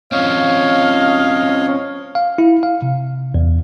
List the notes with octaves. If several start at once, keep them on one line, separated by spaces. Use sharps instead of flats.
C4 C#4 F4 C#5 D#5 F5
F5
E4
F5
C3
E2